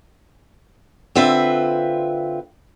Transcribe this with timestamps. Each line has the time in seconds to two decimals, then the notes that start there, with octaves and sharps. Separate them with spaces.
1.16 D3 C4 F4 B4 E5